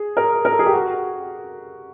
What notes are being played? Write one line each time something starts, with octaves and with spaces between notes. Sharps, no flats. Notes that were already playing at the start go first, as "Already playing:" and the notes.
Already playing: G#4
A#4
A#4
A4
G#4
G4
F#4